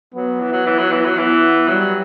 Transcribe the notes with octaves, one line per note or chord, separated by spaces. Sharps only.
F#3 B3
E3
F#3
E3
F#3
E3
F#3
E3 B3
F#3 G3